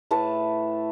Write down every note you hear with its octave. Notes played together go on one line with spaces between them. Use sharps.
A2 A3 B4 A5